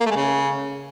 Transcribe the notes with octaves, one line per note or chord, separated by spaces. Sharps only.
A#3
A3
G#3
C#3